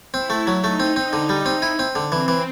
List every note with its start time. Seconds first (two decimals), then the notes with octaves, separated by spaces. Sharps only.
0.14 C4 E4
0.30 A3
0.47 F#3
0.63 A3 D#4
0.80 C4
0.96 C4
1.13 D3
1.29 G3
1.46 C4
1.62 E4
1.79 C4
1.95 D3
2.11 E3 C4
2.28 E3